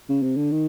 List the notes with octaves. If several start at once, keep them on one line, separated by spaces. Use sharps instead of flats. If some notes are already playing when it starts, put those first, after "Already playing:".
C#3
C3
D3
D#3